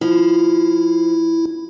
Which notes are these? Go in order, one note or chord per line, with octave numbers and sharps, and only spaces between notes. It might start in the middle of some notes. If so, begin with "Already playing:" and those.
F3 E4